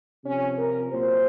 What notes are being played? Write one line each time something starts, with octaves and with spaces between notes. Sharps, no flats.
C3 F3 C#4
A#4
A#2 F#3 C5